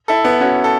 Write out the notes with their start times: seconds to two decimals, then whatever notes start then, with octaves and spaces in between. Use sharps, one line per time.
0.08 E4 A4
0.24 B3 E4
0.40 C#4 F#4
0.64 A4